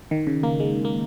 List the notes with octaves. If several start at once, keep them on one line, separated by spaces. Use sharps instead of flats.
D#3
C#3
A#3
G#3
A#3